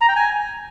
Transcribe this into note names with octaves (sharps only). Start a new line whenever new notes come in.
A#5
G5
G#5